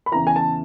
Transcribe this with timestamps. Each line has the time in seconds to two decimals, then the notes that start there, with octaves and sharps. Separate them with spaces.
0.06 B5
0.12 E2 C#3 E3 A#5
0.27 G#5
0.36 A5